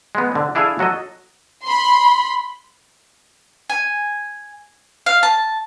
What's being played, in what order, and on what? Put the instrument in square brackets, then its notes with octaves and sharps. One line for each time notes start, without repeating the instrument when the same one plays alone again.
[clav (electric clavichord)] G#3 B3
D3 C4
D4 E4 G#4 A4 F5 G#5
F#3 F#4 A4 D#5
[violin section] B5 C6
[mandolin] G#5
F5
A5